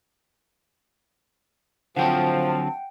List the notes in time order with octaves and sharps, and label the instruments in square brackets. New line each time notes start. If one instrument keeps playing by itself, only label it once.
[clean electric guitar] D3 F#3 C4 [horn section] F3 [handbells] F#5 G5 [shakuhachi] A5